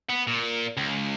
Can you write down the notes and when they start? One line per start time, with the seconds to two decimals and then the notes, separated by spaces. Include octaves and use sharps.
0.10 B3
0.27 A#2
0.77 C#2